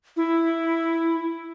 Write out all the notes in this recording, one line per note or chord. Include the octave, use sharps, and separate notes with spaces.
E4